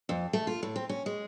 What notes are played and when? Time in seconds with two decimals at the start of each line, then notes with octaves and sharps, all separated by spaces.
0.09 F2
0.33 A3
0.47 F4
0.63 A2
0.76 C4
0.89 C#4
1.06 G#3